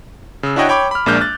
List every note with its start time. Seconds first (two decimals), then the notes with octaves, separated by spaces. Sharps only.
0.43 C#3 E6
0.56 D4 E4 F#4 C#5 D#5 G5
0.69 C#5 G5 B5 D6
0.91 B5 F6
1.06 A#1 G#3 A#3 D4 F6 G6
1.21 F#6 A6